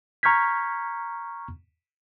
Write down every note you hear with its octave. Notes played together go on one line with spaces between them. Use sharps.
A#5 C#6 F6 G6 G#6 B6